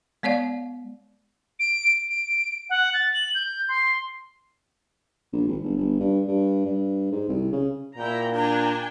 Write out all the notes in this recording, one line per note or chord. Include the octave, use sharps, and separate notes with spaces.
G#3 B3 C#5 D5 F5
D7
D7
F#5
A6
F#7
G6
C6
A#1
G#1
G1
G1
G2
G2
G2
G#2
C2
C#3
A#2 E4 G5 A#5
D4 G5 G#5 A#5